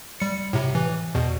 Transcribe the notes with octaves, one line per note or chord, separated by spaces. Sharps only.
G3 C#7
A2 C3
E3
E2 B2